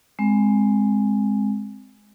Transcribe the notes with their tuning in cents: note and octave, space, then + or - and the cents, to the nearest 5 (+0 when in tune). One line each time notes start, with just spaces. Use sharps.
G#3 +0 C4 +0